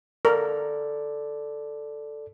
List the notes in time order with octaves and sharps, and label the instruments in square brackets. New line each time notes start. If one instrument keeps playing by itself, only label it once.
[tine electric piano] A4 D5 [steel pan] A#4